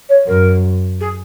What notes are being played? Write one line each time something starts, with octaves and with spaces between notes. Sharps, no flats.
C#5
F#2 A#4
G#4